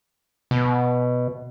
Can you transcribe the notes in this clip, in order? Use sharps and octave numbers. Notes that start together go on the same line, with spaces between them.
B2